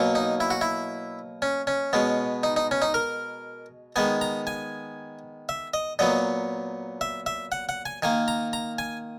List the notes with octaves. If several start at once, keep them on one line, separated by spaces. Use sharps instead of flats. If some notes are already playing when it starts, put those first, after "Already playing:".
Already playing: B2 F#3 A#3
D#4
E4
F#4
E4
C#4
C#4
B2 G#3 B3
D#4
D#4
C#4
D#4
A#4
D#3 G#3 B3 G#5
A#5
G#5
E5
D#5
A#2 F#3 B3 D#5
E5
E5
F#5
F#5
G#5
D#3 A#3 G#5
A#5
A#5
G#5